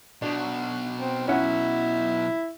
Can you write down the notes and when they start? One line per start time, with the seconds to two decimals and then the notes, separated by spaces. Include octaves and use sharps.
0.22 B2 F#3 D4
0.99 C4
1.28 C#4 E4 F#5